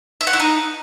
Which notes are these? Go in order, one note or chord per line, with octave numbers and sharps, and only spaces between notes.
E5
F#5
E4
D#4